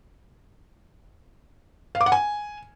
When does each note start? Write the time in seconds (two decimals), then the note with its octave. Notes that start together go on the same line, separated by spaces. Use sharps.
1.95 F5
2.01 D6
2.06 F#5
2.12 G#5